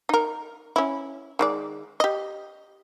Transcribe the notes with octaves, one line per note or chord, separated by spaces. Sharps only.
D#4 A#4
C#4 E4
D#3 G#3 D5
G4 D#5